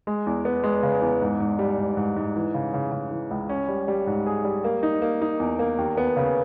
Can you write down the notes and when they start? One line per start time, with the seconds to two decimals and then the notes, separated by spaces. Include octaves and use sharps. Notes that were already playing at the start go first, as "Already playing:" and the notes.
0.07 G#3
0.26 E2
0.45 B3
0.64 G#3
0.83 C#3
1.02 E2
1.22 G#2
1.40 G#2
1.59 G3
1.78 G#2
1.97 G#2
2.16 G#2
2.36 E3
2.54 C#3
2.74 C#3
2.92 C#3
3.11 E3
3.31 C#2
3.49 C#4
3.68 G3
3.88 G3
4.07 G#2
4.26 G#4
4.44 G3
4.64 A#3
4.83 D#4
5.02 A#3
5.22 D#4
5.40 E2
5.59 A#3
5.78 D#2
5.98 B3
6.17 C#3